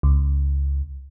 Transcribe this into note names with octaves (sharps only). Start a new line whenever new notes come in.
C#2